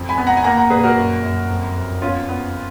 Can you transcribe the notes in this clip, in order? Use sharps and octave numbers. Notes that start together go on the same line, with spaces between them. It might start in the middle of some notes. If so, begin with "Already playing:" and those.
Already playing: F2
G#5 B5
B3
F#5 A#5
G#5
A#3 F#5 A#5
F#5 A#5
A#2 G#4 B4
F#4 A#4
F#2
F#2
F2
F2
B3 C#4 F4
B3